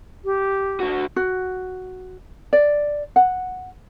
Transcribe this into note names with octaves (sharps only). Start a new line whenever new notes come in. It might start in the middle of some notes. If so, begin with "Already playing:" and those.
G4
D3 F#4
F#4
D5
F#5